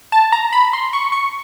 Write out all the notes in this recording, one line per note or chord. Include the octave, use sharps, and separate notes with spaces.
A5
A#5
B5
C6
C#6
C#6